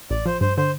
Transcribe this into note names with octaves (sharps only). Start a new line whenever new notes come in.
A1 D5
F3 C5
G2 C5
D3 C5